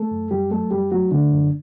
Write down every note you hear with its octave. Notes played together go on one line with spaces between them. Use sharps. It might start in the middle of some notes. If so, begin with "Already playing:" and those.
Already playing: A3 A4
F#2
F#2 G3 G4
F#3 A3 A4
F#2 G3 G4
F#3 A3 F#4
D3 A3 D4
F#2